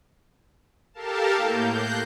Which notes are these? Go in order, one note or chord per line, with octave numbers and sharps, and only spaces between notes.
G4 A4 A#4 F5 A5
A2 A#3 G6
F#6 G6 A#6 C7